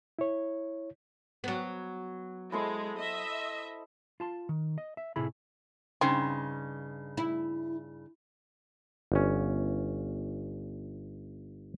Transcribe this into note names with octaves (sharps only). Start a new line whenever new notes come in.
E4 C#5
F#3 B3
G#3 E4 A4 C5
D#5 E5
F4 A5 C6
D#3
D#5
E5
A2 C3 A3 E4 G#4 B5
G2 C#3 C4 D#4
E4
G1 C#4